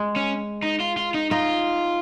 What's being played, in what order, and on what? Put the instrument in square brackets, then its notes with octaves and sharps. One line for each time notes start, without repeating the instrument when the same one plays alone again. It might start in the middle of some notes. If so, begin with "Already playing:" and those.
Already playing: [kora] G#3
[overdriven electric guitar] C#4
D#4
F4
F4
D#4
[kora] D#4 [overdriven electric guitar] F4